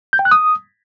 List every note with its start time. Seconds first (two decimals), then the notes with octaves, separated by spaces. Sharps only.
0.13 G6
0.19 G5
0.25 F#6
0.31 D#6